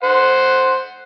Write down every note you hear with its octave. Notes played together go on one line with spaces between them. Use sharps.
C5 F#5